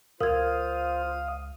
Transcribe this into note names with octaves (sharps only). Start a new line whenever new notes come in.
C#2 F4 A#4 C5 F5 D#6 G#6